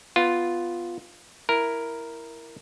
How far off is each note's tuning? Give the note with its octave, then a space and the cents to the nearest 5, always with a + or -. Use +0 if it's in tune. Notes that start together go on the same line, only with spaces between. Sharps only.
B3 +5 F4 +0
E4 +5 A#4 +0